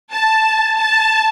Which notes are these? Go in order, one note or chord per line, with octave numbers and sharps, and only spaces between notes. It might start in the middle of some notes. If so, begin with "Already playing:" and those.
A5
A5